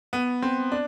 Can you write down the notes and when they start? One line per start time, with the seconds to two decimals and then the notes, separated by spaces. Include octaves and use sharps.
0.13 B3
0.42 C4
0.72 D4